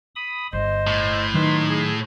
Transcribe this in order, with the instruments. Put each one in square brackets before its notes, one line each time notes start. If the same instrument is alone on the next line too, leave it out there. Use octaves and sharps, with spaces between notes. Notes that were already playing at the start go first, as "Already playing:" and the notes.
[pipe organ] B5 D#6
[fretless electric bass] G1 [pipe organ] C5 [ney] D#5
[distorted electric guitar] A2
[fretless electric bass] D#3 F#3 [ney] D#4 [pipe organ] B4 C6
[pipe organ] G#4